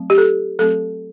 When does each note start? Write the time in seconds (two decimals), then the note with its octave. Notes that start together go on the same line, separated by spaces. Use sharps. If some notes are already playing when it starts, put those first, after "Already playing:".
Already playing: F#3 A3 C4
0.10 G4
0.18 A4
0.59 F#3 A3 C4 A4